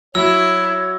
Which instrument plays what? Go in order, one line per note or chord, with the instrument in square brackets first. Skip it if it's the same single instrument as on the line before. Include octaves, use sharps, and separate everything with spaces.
[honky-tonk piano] F#3 [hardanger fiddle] E4 [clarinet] C#5 [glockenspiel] E6